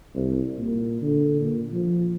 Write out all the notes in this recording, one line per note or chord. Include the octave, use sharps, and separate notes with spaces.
C2
A#2
D3
A#2
F3